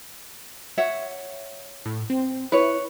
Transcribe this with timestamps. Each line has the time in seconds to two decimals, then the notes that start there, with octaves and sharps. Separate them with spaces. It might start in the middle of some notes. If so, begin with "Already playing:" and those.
0.78 C#5 E5 F#5
1.86 A2
2.10 C4
2.52 E4 B4 C#5